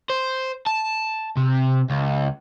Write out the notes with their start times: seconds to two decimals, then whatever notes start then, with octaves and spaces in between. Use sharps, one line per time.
0.10 C5
0.67 A5
1.37 C3
1.90 C#2